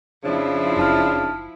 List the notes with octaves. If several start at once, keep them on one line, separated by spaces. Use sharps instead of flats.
F2 C#3 F3 D4 E4
F#1 D#4 A5 F6